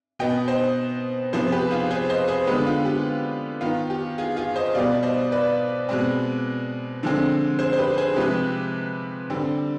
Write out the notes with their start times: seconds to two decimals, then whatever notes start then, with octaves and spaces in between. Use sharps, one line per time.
0.19 B2 B3 D#5 G5
0.48 C5 D#5
1.33 C3 F3 B3 G#4 C5
1.52 G4 B4
1.71 F4 G#4
1.91 G#4 C5
2.09 C5 D#5
2.28 G#4 C5
2.47 D3 G#3 B3 G4 B4
2.66 F4
2.85 G4
3.61 D#3 B3 F4
3.90 G4
4.18 F4 G#4
4.36 F4 G#4
4.56 C5 D#5
4.66 D#5
4.75 B2 G3 B3 D5 F5
5.03 C5 D#5
5.32 B4 D5
5.89 B2 G#3 C4
7.03 D3 F3 G#3 C4
7.59 G#4 C5
7.73 C5
7.79 G4 B4
7.98 G#4 C5
8.16 C3 F3 G#3 G4 B4
9.30 D3 G3 C4